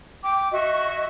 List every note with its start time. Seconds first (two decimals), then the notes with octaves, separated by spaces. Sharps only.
0.22 G5 D6
0.51 F#4 D#5 E5 C#6